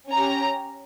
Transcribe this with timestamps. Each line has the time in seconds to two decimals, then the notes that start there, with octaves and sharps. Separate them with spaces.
0.10 C#4 G4 A#5